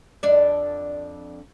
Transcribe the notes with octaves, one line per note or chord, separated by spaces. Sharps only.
F2 D4 D5